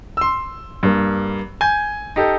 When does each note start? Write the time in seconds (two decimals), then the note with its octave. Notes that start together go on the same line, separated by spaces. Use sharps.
0.17 C6 E6
0.83 G2 A#3
1.61 G#5 G6 G#6
2.16 D#4 G4 A4